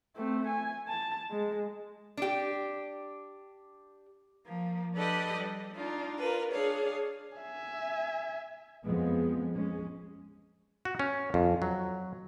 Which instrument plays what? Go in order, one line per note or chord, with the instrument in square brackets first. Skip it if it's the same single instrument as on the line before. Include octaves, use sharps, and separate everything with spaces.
[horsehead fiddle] A3 C4
G#5
A5
G#3
[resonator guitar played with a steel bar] D4 G4
[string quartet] F3 A#3
D4 G4 A4 B4 D5 D#5
G3
D4 D#4 F4
F4 A#4 B4
D4 G#4 C#5 F5
[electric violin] E5 G#5
[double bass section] F2 F3 G#3 B3
G#3 C#4
[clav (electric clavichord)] F#4
C#4
F2
F#3